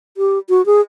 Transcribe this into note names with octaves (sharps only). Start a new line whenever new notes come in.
G4
F#4
G#4